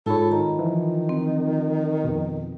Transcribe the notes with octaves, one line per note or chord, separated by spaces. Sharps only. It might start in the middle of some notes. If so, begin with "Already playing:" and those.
G#2 F4 A4 C#5 B5
D#3 A#5
E3 F3
C4
F2 B2